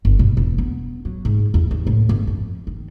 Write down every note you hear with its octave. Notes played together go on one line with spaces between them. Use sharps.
G1
B2
E1
B3
F#3
G#2
E2
D#2
A2
G1
F2
D#3